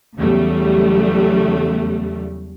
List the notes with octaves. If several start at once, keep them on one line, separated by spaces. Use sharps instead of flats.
E2 C#3 F#3 G3 A3